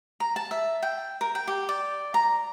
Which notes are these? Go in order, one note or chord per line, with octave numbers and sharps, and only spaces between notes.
A#5
A5
E5
G5
A#4
G5
G4
D5
A#5